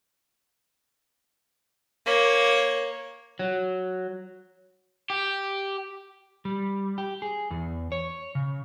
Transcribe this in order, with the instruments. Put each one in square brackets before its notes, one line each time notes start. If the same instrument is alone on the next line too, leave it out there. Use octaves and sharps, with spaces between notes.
[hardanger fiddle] A#3 C#5
[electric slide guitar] F#3
[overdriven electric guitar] G4
[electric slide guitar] G3
G4
G#4
E2
C#5
C#3